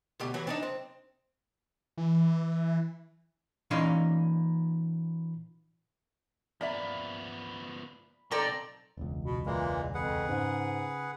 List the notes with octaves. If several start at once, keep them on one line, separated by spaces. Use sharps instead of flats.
D2 B2 G4
E3 F#3
C4 D4 D#4
C4
E3
A#2 E3 C#4 D#4 F5 C6
F3 A#3 B3 D5 E5 B5
B1 F2 C4 D#4 A4 D5 A#5 D6
E1 C#2
B2
A#2 E3 G#3 A#3
F2 G#4 B4 F#5
G#2 C#3